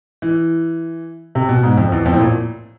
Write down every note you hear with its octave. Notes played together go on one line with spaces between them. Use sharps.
E3
C3
B2
G#2
F2
E2
F2
A2
A#2